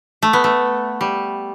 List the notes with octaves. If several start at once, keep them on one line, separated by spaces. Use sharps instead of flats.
A3
B3
A3
G3